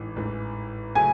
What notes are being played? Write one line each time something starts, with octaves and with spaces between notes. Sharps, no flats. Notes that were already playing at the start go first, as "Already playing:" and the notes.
Already playing: A1 G#2 E3
A1 G#2 E3
C#3 F#3 A3 G#5